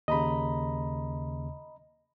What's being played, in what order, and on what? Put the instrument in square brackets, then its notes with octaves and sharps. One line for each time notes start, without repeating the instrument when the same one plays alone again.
[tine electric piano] D#2 C#3 [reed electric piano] D#5 A#5 B5